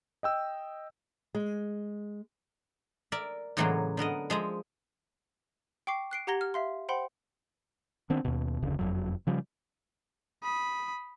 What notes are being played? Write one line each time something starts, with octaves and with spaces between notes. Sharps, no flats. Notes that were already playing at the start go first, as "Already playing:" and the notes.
D#5 G5 E6
G#3
A#4 D5 E5
A2 C#3 E3 F#3 G#3 A#3
D3 B3 A#4 D#5
F3 G#3 E5 A#5
G5 C#6 D6 C7
F#6 C7 D7
G4 F#5 A#5 G#6 A#6 G7
F6
E5 F5 C6
C5 F#5 G5 B5 C6
D#3 B3 C4 D4
D#2 B2
F1 D2 C#3
F#1 F2 F#3
C#3 F3 G3
B5 D#6